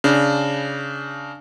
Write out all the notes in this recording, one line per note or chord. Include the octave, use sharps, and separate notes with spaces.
C#3 D4